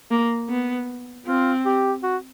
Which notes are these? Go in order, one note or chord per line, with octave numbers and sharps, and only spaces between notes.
A#3
B3
C4 F4
G4
F#4